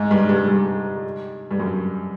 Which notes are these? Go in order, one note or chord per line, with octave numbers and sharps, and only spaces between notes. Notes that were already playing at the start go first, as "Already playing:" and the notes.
Already playing: G#2
G2
G2
G2
G2
F#2